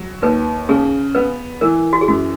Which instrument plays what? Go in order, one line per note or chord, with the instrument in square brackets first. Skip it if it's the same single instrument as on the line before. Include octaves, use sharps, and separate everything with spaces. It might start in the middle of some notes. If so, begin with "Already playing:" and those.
Already playing: [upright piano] F#3
[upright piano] D#2 [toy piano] B4
[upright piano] C#3 [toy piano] G#4
[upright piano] B3 [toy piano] B4
[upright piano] E3 [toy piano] A#4
[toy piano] F#4
G#4
[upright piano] F#2 [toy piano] F#4